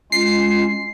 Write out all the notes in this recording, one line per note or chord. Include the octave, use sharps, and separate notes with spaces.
G#3 C#4 F4 C7